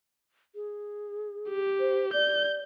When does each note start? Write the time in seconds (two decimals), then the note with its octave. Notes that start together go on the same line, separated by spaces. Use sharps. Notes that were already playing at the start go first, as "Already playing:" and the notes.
0.55 G#4
1.50 G4
1.80 C5
2.13 D5 G6